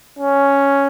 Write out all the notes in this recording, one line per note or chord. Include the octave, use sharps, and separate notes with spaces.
C#4